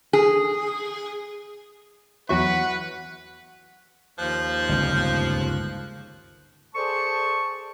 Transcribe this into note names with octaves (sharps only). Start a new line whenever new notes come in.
G#4
E2 F#3 E4 B4 F#5 C#6
D#2 F3 F#6
G1 C#2
G#4 A4 C5 D5 A5 C#6